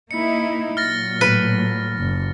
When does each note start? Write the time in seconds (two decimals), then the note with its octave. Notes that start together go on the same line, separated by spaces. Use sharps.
0.11 A#3 D#4 E4 C#7
0.77 A#2 F#3 F6 A6 A#6
1.21 A2 B4
1.99 F#1